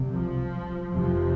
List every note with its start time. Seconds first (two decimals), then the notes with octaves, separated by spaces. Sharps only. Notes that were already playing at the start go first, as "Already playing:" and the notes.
Already playing: C2 C3
0.12 F3
0.93 F1 F2 C3 F3